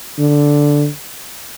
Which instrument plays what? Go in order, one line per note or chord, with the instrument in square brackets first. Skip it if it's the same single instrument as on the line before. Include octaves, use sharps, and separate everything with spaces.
[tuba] D3